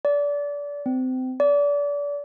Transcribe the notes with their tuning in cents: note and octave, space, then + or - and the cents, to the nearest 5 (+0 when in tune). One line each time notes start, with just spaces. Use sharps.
D5 -25
C4 -30
D5 -30